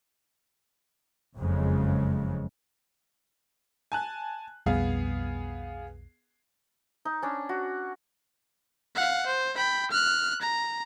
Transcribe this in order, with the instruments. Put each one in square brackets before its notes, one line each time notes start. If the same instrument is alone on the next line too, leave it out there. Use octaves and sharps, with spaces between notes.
[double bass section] F#1 F2 C#3 G#3
[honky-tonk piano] G#5 A5 F#6
[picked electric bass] B1 F2 G3 [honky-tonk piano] B3 G#4 F5
[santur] D#4
C#4 D4
F#4
[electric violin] F5 F#5
C5
G5 B5
F6 F#6
A#5